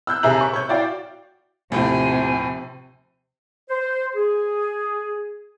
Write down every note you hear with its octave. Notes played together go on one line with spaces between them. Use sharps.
E6 F#6 G6
D#2 C3 G#4 E5 A#5 F#7
C#6
C#5 G6
E4 F#4 D5 F5 G5
D#2 A2 C3 F3 G#5
C5
G#4